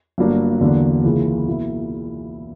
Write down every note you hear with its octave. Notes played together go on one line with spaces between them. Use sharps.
G1 G2 F#3 A#3 D4
E2 D3 F#3 A#3 D4
C#2 C#3 E3 A#3
B2 A#3 E4